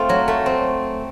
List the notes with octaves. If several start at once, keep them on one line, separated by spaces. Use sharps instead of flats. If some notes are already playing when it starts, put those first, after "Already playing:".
Already playing: A3 C4 F4
F#3
A3
C4